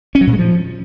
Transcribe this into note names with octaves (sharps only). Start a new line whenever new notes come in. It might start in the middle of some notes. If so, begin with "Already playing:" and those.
C#4
F#3
A#2
G#3
F3